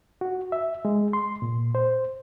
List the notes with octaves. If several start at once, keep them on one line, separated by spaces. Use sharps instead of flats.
F#4
E5
G#3
C6
A#2
C5